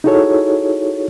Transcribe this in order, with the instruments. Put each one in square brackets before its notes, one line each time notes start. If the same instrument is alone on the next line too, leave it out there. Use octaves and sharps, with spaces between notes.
[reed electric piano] D#4 E4 F#4 G#4 A4 C#5